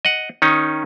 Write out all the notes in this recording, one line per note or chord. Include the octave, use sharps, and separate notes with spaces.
D#5 F#5
D#3 C#4 D#4